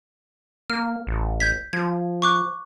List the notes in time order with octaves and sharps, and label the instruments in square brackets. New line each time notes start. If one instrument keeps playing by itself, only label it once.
[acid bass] A#3 [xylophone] F6
[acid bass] A1
[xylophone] G6 G#6 B6
[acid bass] F3 [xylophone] G#6
[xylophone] C#6 D6 F#6